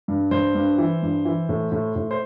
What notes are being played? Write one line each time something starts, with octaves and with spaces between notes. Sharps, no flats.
G2
G2 C5
G2
E3
G2
E3
A2
A2
A2
C5